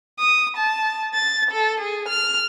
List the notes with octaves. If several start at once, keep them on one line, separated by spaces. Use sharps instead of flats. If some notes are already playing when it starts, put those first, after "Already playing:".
D#6
A5
A6
A4
G#4
F6